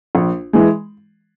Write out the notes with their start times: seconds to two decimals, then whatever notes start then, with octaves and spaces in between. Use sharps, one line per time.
0.15 A#1
0.53 E3 G#3